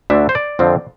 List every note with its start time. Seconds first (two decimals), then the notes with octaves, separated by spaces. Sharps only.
0.10 D2 D3 A3 D4 E5
0.29 C5
0.35 D5
0.59 F2 D3 F3 C4